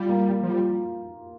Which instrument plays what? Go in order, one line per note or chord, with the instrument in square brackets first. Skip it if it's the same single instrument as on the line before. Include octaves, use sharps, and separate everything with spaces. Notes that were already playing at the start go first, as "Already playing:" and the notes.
Already playing: [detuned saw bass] G3 [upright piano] F4
[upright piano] A#3
A#3
[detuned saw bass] F3
[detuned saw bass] G3 [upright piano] F4